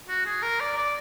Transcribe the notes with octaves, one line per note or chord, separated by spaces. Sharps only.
F#4
G#4
A#4
D5
D5